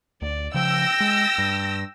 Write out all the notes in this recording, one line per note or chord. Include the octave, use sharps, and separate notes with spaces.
D2 D5
C#3 F3 G5 E6 A#6
G#3
G2